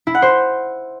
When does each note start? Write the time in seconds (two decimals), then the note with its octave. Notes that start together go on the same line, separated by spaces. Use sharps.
0.07 E4
0.15 F#5
0.22 C5